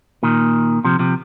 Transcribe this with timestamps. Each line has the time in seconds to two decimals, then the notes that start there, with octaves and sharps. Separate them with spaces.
0.23 A#2 D#3
0.84 C3 F3
0.99 C3 F3